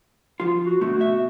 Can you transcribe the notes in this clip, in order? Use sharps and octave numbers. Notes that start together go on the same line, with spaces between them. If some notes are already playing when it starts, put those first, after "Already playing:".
F3 F4
F#4
B2 D3 A3 F#4
B2 E5